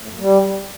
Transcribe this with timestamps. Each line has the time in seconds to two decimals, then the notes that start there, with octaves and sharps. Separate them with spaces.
0.02 A2
0.08 F#2
0.14 A#2
0.20 G3